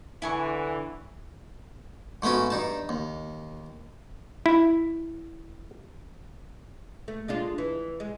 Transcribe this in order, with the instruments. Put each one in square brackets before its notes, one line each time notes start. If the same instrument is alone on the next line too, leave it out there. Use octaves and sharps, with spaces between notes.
[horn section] D3 E3 [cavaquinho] E4 G#5 C#6
[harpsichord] G#2 A3 B3 C#4 F#4
G2 D#4 A5
D#2
[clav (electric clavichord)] E4
[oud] A3
G#3 D4 F4
E3
G#3